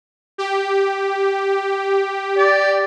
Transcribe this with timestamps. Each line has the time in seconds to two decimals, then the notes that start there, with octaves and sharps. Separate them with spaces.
0.38 G4
2.37 D5